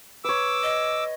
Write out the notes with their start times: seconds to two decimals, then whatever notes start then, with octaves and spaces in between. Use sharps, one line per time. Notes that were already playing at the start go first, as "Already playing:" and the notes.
0.24 B4 C#5 D6 E6
0.63 D#5